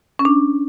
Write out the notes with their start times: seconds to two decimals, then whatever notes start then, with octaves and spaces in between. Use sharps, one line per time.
0.19 C#4
0.25 D4